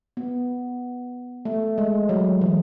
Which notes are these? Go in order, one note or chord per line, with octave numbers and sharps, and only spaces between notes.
B3
A3
G#3
F#3
E3